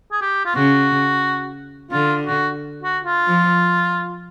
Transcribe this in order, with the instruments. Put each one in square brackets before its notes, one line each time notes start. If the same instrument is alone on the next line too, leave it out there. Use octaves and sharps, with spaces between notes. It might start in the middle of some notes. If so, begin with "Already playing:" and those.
[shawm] G#4
G4
F4
[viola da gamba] C#3 [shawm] F#4
[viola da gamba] D3 [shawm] F4
[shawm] F#4
F#4
F4
[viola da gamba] F3